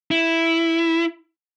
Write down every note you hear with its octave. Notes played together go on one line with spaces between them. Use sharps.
E4